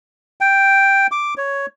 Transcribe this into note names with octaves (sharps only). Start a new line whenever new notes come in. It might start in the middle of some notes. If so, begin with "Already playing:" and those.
G5
D6
C#5